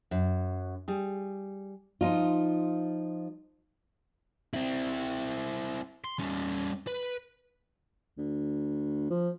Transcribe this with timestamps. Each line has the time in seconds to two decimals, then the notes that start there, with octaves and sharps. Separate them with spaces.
0.11 F#2
0.88 G3 G#4
2.01 F3 D#4 F4
4.54 C4 E4
6.04 C6
6.19 G3 C#4
6.87 B4
8.18 D2
9.10 F3